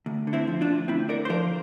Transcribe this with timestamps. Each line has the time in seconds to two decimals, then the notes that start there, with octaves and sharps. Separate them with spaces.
0.06 D2
0.27 D3
0.33 C4 E4
0.47 F3
0.61 D4 F4
0.69 D2
0.88 D2 C4 E4
1.09 D3 A#4 D5
1.25 C5
1.29 F3 A#4 D5